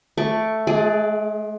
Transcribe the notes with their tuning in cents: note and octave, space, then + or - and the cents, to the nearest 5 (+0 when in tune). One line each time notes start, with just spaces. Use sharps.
A3 +0 D5 +0 C#6 +0
G#3 +40 G#4 +0 D5 +0